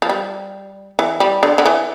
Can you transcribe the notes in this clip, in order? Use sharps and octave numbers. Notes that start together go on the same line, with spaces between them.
F3
G3
E3
G3
D3
D3
E3